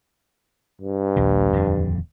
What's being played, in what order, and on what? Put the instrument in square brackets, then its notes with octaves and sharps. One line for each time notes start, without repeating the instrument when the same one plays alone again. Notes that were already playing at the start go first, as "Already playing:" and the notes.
[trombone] G2
[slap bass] A#1 D#2
D#1 F2 D3